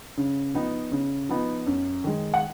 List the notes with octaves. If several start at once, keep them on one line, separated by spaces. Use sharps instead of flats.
C#3
F3 B3 D#4
C#3
F3 B3 D#4
F#2
D#3 G#3
F#5